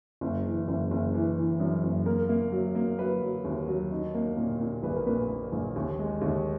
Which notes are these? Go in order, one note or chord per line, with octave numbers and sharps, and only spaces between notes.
F#1
E3
F#1
F#1
E3
E3
F#2
F#1
A#3 A#4
A#3
F#3
A#3
F#3 B4
F#3
D#2
F#3
D#4
A#3
A#2
A#2
A#1 B4
A#4
A#2 B4
A#3
A#1
D#2
G#3
D#2